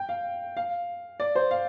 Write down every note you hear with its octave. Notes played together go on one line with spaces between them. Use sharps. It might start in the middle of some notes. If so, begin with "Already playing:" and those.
Already playing: G5
F5
F5
D5
C5
F5